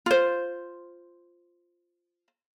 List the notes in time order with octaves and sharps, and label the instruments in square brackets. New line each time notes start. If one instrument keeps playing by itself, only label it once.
[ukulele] F4 C5